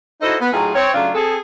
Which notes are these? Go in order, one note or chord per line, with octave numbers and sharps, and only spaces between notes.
D#4 E4 F#4 A4 C5 D#5
B3
A2 F#3 D#4 F4 G#4
C4 C#5
C#3 F#3 A3 D4 F4
C4 G#4 A4